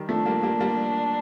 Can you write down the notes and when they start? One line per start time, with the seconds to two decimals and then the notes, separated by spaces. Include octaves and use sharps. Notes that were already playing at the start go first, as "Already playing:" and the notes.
Already playing: D#3 G3
0.08 F3 A3 D4
0.26 G3 A#3
0.43 G3 A#3
0.61 G3 A#3